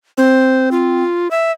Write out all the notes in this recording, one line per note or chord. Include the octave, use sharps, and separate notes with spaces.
C4 C5
F4
E5